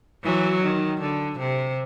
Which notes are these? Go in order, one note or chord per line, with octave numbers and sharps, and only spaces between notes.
E3 F#3
D#3
D3
C3